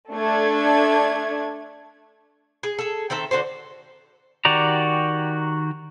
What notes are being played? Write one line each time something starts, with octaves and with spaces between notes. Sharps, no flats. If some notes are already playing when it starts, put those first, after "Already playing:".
A3 D4 G#6
G#4
G#4 A4
D#3 C4 A4 E5
D3 F#4 A4 C5
D#3 F#4 G4 D5 A#5